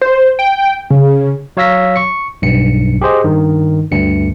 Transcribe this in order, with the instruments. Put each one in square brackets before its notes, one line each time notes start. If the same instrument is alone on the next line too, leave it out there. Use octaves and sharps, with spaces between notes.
[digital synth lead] C5
G5
C#3
[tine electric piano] F#3 C#5 F5 E6 A#6 B6
C#6 C#7
B1 G2 C#7
G4 G#4 C5 D#5
G2 D#3
D2 G2 C#7